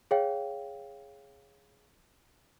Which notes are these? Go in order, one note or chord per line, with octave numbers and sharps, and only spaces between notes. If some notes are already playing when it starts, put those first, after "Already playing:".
G#4 C#5 F5 G5